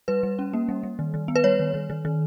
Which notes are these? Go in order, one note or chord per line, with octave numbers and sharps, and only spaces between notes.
G3 B4
G3
C#4
A#3
G3
G3
D#3
D#3
B3
B4
G3 C#5
D#3
D#3
D#3
D#3